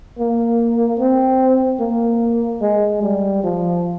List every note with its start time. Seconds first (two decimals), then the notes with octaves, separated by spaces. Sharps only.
0.19 A#3
0.99 C4
1.80 A#3
2.62 G#3
3.02 G3
3.44 F3